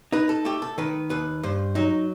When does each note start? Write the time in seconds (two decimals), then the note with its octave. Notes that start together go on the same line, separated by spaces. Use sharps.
0.12 D#4 B4
0.29 A4
0.45 A3 G4
0.62 A4
0.78 D#3 B4
1.10 D#2 B4
1.43 G2 C5
1.75 F#3 D#4